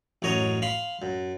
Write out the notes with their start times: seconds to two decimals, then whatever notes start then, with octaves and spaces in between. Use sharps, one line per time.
0.22 A1 F#2 C#5 D#5 A#5
0.62 F5 B5 C6
1.02 F#2